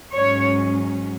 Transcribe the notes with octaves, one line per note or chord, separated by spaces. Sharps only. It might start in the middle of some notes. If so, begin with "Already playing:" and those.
G#2 F#3 C#4 C#5